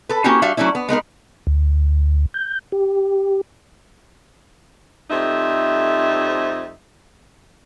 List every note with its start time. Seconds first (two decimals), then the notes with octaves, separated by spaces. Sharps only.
0.09 A4 B4
0.24 A#3 C4 C#4 E4 F#4 G4
0.42 G3 D4 F#4 E5 F5
0.57 F#3 A3 C#4 D4 E4
0.75 B3
0.89 G#3 B3 D#4 A#4
1.47 D2
2.34 G6
2.72 G4
5.10 F2 G3 A3 C4 D#4 E5